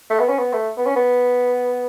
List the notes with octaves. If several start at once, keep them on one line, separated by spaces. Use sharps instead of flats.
A3
B3
C#4
B3
A3
B3
C#4
B3